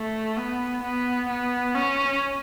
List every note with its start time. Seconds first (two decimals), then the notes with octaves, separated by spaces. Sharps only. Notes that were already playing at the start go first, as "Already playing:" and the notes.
Already playing: A3
0.37 B3
0.83 B3
1.29 B3
1.75 C#4